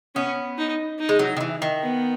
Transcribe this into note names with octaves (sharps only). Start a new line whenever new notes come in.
B3 C#4
D#4
D#4
G#3
F#3
D#3
E3
D#3
B3